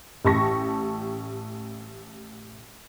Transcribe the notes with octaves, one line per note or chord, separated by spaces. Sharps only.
A1 G4 A5 C#6 A#6